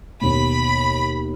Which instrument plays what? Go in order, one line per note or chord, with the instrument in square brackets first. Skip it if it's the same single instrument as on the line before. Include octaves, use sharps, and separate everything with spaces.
[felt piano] D#2 B2 [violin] B5